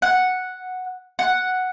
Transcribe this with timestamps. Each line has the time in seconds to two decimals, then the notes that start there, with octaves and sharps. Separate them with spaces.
0.02 F#5
1.19 F#5